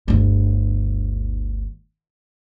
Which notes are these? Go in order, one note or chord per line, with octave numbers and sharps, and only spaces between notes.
G1 D2